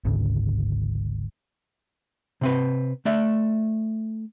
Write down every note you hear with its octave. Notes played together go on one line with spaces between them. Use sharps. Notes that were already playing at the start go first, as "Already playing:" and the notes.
G#1 D2 G#2 C#3
C3 C4 B4
A3 D5 E5